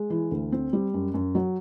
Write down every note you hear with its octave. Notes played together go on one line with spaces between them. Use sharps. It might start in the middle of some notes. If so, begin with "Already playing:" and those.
Already playing: G#3
E3
D2
C4
G3
F#2
F#2
F#3